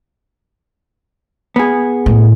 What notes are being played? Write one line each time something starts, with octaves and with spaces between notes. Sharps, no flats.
B3 G#4
A2